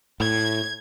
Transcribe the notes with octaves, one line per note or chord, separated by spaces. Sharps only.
A2 G#6